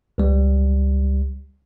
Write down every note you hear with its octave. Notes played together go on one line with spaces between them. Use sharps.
C#2 G3